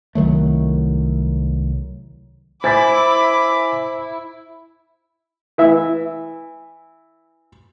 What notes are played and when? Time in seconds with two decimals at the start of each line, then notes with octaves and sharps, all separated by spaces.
0.15 C2 D#3 F#3 A3
2.64 E4 C5 G#5 B5 D6 A6 B6
5.58 E3 E5